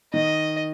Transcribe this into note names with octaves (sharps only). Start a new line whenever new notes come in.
D#3 D#5